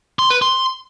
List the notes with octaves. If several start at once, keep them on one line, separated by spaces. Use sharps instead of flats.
C6
B4
C6